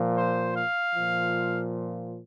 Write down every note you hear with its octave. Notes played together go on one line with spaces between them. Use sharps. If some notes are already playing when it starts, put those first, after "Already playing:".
Already playing: A#2 F3
C5
F5
F3
A#2